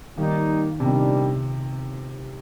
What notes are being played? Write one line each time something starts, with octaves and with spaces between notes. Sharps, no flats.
D#3 G3 A#3 D#4
C3 D#3 G3 D4